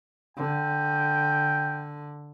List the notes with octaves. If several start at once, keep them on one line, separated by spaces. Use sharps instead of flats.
D3 G5